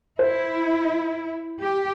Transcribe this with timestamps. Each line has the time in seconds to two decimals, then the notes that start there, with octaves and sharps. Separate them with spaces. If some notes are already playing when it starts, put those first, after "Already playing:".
0.19 E4 C5
1.61 G4